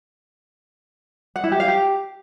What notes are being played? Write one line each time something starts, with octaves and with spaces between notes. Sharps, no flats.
F#5
E4
G4
F5
G4